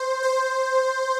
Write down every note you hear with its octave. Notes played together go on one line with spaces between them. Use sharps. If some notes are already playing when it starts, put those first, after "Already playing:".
Already playing: C5
C5